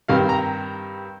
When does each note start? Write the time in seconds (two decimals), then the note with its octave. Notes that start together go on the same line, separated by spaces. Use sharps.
0.08 G2 D#3 G3 C4 F5
0.29 A#5